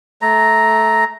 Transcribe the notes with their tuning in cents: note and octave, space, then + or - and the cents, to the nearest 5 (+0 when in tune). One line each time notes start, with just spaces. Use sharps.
A3 -15 A#5 +0